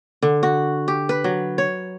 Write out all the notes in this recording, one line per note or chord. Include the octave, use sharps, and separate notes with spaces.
D3
F#4
G4
B4
F#3
C#5